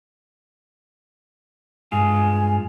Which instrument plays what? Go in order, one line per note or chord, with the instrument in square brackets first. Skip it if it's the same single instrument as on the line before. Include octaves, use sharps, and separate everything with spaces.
[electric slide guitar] G2 G#3 F4 [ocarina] G#5